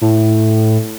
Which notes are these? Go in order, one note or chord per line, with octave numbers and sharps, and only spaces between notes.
A2